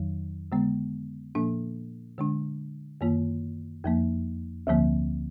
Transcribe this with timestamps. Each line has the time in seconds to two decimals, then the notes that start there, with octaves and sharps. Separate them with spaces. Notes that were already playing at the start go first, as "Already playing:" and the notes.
Already playing: F2 D#3 F#3
0.52 D3 G#3 B3
1.35 A#2 F3 A#3 D4
2.18 D3 G#3 D4
3.01 F#2 D#3 A#3 F4
3.84 F2 F3 A#3
4.67 D2 D3 F3 A#3